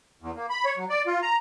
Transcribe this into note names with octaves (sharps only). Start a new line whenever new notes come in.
E2
A#3
B5
C#5
F#3
D5
F4
A#5